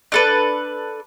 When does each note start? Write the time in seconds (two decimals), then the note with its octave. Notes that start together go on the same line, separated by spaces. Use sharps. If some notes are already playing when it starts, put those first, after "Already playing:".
0.12 D4 A4 B4